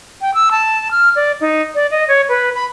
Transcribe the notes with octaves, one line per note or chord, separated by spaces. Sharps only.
G5
E6
A5
F6
D5
D#4
D5
D#5
C#5
B4
B5